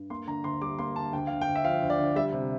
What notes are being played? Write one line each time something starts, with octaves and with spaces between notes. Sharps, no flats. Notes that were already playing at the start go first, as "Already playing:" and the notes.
Already playing: G2
A#3 C6
D3 A#5
D2 C6
G3 D6
A#3 C6
D3 A5
D2 G5
D3 F5
G5
D2
E5
F3 F5
D2
D5
D3
G3 E5
C3